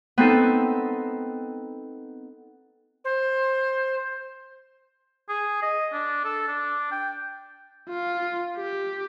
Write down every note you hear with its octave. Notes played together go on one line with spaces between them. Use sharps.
B3 C4 D#4 A4
C5
G#4
D#5
D4
A4
D4
G5
F4
G4